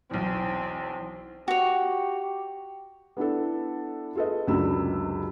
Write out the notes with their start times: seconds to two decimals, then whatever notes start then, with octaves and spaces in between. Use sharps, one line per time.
0.11 B1 E2 C4
1.48 F#4 G4 C#5
3.17 B3 D4 E4 A4
4.15 F4 G#4 A4 B4 D#5
4.47 C#2 F#2 C3 D4 B5 E6